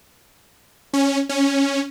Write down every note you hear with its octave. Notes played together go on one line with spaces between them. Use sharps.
C#4
C#4